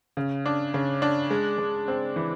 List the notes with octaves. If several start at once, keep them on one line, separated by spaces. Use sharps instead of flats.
C#3
D4
C#3
D4
G#3
G#3
C4
E3